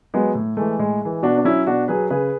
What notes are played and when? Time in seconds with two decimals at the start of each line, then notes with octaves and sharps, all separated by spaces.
0.14 F#3 G#3 B3
0.35 A2
0.57 E3 G#3 A3
0.79 A2 G#3
1.02 E3 G#3
1.23 B2 D4 F#4
1.38 D4
1.45 F#3 C#4 E4
1.67 B2 D4 F#4
1.88 F#3 G#4 B4
2.10 C#3 G#4 B4